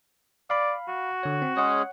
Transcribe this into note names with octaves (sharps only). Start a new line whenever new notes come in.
D5 F5 B5
F#4
D3 C#5
C4
G#3 C#4 G#4 C#5 F#5